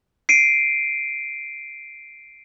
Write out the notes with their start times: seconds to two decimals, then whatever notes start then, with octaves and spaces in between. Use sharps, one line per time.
0.29 C7 D7 D#7